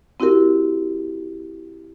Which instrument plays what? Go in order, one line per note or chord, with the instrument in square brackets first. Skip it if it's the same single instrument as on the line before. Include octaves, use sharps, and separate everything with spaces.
[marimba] C4 E4 F#4 G4 A#4